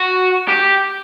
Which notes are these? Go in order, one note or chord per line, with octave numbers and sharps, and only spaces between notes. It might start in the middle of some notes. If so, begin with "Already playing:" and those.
Already playing: F#4
G4